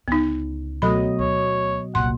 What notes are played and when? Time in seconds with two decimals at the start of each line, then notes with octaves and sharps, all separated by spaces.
0.08 C#2 D3 B3 D#4
0.82 B2 F#3 A3 A4 D#5 B5
1.19 D2 C#5
1.95 F#1 C2 A#2 F#5 C6